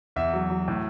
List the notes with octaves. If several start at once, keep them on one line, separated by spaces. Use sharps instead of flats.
E2 E5
F#3
F#3
A2